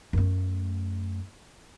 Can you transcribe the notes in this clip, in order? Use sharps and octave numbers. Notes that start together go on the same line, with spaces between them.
F#2 A3